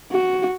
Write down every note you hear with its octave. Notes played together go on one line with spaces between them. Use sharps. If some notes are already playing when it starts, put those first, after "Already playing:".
F#4